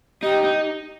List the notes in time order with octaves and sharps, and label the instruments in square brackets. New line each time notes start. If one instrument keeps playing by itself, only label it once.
[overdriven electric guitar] D#4 [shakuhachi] G4
[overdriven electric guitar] D#4